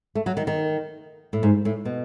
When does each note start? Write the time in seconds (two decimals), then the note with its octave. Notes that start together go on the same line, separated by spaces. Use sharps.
0.15 A3
0.26 F#3
0.37 D#3
0.47 D#3
1.33 A2
1.43 G#2
1.65 A2
1.85 B2